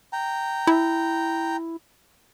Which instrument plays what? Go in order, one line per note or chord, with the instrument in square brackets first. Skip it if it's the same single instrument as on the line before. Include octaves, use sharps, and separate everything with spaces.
[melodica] G5 A#5
[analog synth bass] E4